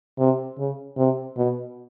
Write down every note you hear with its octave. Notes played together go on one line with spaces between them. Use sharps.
C3
C#3
C3
B2